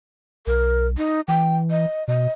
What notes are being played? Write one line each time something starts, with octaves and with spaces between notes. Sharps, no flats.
B1 A#4
D#4
E3 G5
D#5
B2 D#5